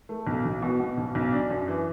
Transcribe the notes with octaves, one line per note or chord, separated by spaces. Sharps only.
A3
B1
B1
B2
B2
B1
B1
D4
F#2
E3